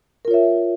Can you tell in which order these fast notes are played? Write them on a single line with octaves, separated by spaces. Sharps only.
A#4 F4 C#5 E5